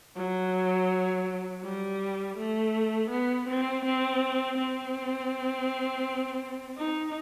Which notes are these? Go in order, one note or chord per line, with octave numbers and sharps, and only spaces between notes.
F#3
G3
A3
B3
C4
C4
C4
D#4